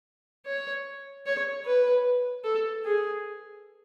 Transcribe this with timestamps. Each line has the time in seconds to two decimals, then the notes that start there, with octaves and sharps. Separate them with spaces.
0.46 C#5
1.26 C#5
1.65 B4
2.44 A4
2.85 G#4